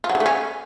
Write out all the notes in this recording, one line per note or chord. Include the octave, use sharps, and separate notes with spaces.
F4
F#3
D#3
A3
C#4